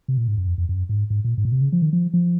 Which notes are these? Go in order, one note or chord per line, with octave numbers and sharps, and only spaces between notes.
C3
A#2
G#2
F#2
F2
F2
F#2
G#2
G#2
A#2
G#2
A#2
C3
C#3
F3
D#3
F3
F3